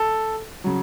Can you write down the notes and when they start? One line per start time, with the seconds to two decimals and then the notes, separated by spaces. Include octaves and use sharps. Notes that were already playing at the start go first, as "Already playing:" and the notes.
Already playing: A4
0.64 C#3 F#3